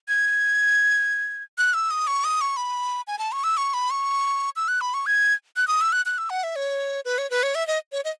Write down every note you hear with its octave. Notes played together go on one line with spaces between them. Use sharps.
G#6
F#6
E6
D#6
C#6
D#6
C#6
B5
G#5
A5
C#6
E6
C#6
B5
C#6
E6
F#6
B5
C#6
G#6
F#6
D#6
E6
F#6
F#6
E6
F#5
E5
C#5
B4
C#5
B4
C#5
E5
D#5
C#5
D#5